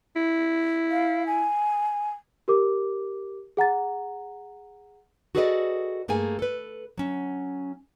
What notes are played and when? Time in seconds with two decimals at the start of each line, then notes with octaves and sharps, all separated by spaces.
0.16 E4
0.91 F5
1.27 G#5
2.48 G4 A#4 D6
3.57 G#4 F#5 A#5 A6
5.35 F#4 G#4 A4 B4 D5 D#5
6.08 G2 A3 A#3 G#4 G#5
6.39 A4 B4
6.97 F#3 C#4